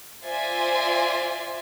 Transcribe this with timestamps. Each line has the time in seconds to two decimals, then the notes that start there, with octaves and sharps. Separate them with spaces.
0.24 F4 C5 D5 E5 G#5 C6